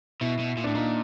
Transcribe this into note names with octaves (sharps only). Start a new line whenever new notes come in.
B2 E4
B2
A#2
A2 D4
A#2 D#4